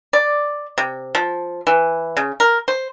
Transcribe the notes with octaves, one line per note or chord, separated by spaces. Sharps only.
D5
C3
F3
E3
C#3
A#4
C5